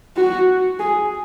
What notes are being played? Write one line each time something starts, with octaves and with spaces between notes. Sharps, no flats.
F#4
G#4